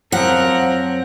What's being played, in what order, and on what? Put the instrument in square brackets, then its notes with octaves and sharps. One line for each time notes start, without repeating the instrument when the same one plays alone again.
[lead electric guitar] F#2 C4 [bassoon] F3 [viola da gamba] A#4 [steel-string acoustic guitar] F#5